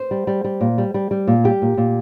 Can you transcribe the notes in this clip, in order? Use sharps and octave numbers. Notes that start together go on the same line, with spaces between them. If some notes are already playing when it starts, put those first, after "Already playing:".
Already playing: C5
G3
G3
G3
A#2
G3
G3
G3
A#2
G3 G4
A#2
A#2